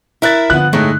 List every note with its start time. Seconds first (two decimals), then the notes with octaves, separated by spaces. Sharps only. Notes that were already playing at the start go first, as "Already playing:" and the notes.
0.22 E4 A#4 E5 F#6 A6
0.50 G2 D3 F3 B3 F#6
0.73 A2 G#3 A3 D#4